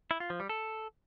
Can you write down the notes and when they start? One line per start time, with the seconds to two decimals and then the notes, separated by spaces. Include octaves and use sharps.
0.11 E4
0.20 F4
0.30 F3
0.40 G3
0.49 A4